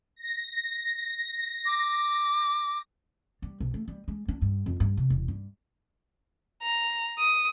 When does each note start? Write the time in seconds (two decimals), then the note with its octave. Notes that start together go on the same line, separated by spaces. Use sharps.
0.16 A#6
1.66 D6
3.42 G3
3.60 B1
3.74 A3
3.88 G3
4.08 G#3
4.28 D4
4.42 G2
4.66 F2
4.80 G2
4.97 C3
5.10 E1
5.28 G2
6.63 A#5
7.19 D#6